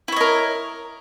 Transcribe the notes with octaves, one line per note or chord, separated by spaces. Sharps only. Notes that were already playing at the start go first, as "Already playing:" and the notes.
E4 A#4 C#5 D#5